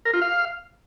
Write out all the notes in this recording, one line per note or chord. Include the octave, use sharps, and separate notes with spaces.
A#4
F4
F5